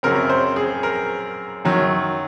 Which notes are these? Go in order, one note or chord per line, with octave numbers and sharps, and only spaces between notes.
F#2 C#3 F#3 C4 A#4
C5
G#4
A#4
F#2 D#3 F#3